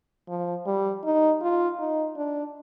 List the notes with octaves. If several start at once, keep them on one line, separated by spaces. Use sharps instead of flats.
F3
G3
D#4
F4
D#4
D4